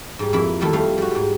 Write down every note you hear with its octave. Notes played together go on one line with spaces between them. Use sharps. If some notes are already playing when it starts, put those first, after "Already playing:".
G#2 G3
F2 A#3 E4 B5
D#3 G3 A3 E4 A4
F2 G3 A3 F5
G3 F#4
G#2 G3